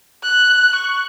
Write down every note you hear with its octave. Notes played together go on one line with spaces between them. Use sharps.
F#6
C#6